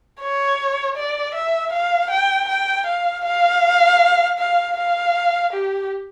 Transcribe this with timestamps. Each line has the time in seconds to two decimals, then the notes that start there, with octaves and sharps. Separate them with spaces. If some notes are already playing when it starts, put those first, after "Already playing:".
0.20 C#5
0.96 D5
1.35 E5
1.73 F5
2.10 G5
2.48 G5
2.86 F5
3.25 F5
4.38 F5
4.77 F5
5.53 G4